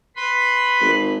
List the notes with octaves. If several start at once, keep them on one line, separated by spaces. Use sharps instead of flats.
B4 B5 C6
G#1